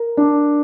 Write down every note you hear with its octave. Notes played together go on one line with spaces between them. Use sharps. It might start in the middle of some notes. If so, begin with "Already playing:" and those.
Already playing: A#4
D4